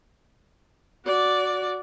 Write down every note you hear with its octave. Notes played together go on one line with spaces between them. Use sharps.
F#4 D5